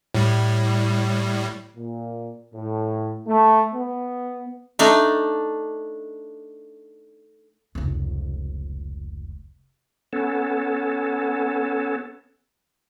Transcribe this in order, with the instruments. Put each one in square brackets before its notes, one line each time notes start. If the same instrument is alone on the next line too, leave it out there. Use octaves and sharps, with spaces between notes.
[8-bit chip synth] A2 G3
[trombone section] A#2
A2
A3
B3
[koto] A3 D4 D#4
[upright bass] F1 C#2
[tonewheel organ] B3 C#4 A4